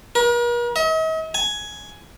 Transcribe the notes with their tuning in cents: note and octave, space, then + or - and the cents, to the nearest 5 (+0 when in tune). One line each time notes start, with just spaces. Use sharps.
A#4 +45
D#5 +45
G#5 +10